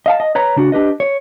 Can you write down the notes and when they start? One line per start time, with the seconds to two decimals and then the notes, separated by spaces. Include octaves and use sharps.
0.06 D#5 F5 A5
0.20 D#5
0.35 B4 C#5 A#5
0.56 C#3 D4 F#4
0.72 D4 G4 B4 D#5
1.00 C#5